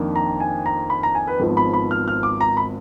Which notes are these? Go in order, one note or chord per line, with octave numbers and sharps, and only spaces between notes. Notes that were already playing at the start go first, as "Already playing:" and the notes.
Already playing: F2 D#3 A#3 D4
A#5
G#5
A#5
B5
A#5
G#5
B4
G#1 G#2 F3 B3
B5
B5
F6
F6
D6
A#5
B5